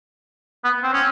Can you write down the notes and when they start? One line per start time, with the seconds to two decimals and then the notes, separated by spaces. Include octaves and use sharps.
0.64 B3
0.83 C4
0.93 C#4